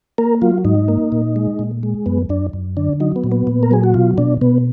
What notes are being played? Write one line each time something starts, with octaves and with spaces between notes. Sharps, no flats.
A#3 A#4
F#3 F4
G#2 D#4
A#3
A#2
G#3
A#2
G#3
F#2 B3
F#2 D4
F#2
D3 D4
F#3 D#4
B3
A#2
B3
A#2
A#4
F#3 G#4
F#4
B2 F4
B2 D4
B2 B3